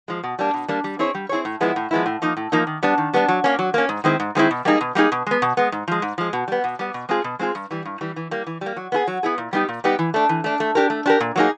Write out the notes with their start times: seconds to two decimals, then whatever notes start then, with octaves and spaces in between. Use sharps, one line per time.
0.08 F3 G#3
0.23 B2
0.39 G3 A#3 D4
0.54 B2
0.68 G3 A#3 D4
0.84 G3
0.99 C4 E4 G#4 C#5
1.15 G3
1.29 C4 E4 G#4 C#5
1.45 A2
1.61 F3 G#3 B3 E4
1.76 A2
1.91 F3 G#3 B3 E4
2.06 A2
2.22 F3 A#3 D#4
2.37 A2
2.52 F3 A#3 D#4
2.67 D#3
2.83 G3 B3 D4
2.98 D#3
3.14 G3 B3 D4
3.28 F#3
3.44 A#3 C#4
3.59 F#3
3.74 A#3 C#4
3.89 G#2
4.04 D#3 G#3 C4 E4
4.20 G#2
4.35 D#3 G#3 C4 E4
4.51 B2
4.65 G3 A#3 D#4 G#4
4.81 B2
4.95 G3 A#3 D#4 G#4
5.12 B2
5.27 G#3 B3
5.42 B2
5.57 G#3 B3
5.72 G#2
5.88 F3 G#3
6.02 G#2
6.18 F3 G#3
6.33 B2
6.48 G3 B3
6.64 B2
6.79 G3 B3
6.94 B2
7.09 G#3 C4 F4 G#4
7.24 B2
7.39 G#3 C4 F4 G#4
7.55 G2
7.71 E3 G3
7.85 G2
8.01 E3 G3
8.16 E3
8.31 G3 A#3
8.47 E3
8.61 G3 A#3
8.77 F#3
8.92 B3 E4 G#4
9.07 F#3
9.23 B3 E4 G#4
9.38 A#2
9.53 G3 B3 D#4 G4
9.69 A#2
9.84 G3 B3 D#4 G4
9.99 E3
10.14 A3 D4
10.29 E3
10.44 A3 D4
10.60 A3
10.75 D4 G4 A#4
10.90 A3
11.06 D4 G4 A#4
11.20 A#2
11.36 F#3 A#3 D#4 G#4